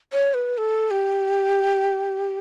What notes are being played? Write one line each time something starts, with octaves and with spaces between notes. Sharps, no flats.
C#5
B4
A4
G4